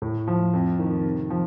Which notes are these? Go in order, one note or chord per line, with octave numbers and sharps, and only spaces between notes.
A2
F3
F2
D#3
C3
F3